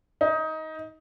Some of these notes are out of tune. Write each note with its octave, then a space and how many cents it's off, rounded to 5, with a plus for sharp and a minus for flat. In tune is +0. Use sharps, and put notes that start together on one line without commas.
D#4 +20